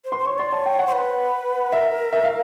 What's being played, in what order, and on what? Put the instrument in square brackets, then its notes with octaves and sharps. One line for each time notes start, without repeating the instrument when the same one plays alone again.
[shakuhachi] C5
[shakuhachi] B4 [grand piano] C6
[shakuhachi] C5
[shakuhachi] C#5 [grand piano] C#6
[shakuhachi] D5 [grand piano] C6
[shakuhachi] C#5 [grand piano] A5
[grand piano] G5
F#5
[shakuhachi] C5
B4
[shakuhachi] A#4 [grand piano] E5
[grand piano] E5
F5